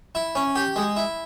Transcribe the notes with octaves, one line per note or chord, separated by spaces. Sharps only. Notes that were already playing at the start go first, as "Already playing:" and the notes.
E4
C#4
G4
G#3
E4